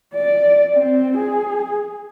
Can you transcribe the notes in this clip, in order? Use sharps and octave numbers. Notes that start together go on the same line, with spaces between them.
D5
C4
G#4